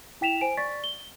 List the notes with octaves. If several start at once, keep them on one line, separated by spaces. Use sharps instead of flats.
E4 G5 B6 E7 F7
C5 G#5 D7
D5 C#6 A6 B6
G7